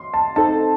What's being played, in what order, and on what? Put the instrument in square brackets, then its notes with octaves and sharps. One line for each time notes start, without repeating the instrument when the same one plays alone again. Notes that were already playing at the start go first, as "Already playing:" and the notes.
Already playing: [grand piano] C6
A5
[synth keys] C4 D#4 A4 C5 D#5 [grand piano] A5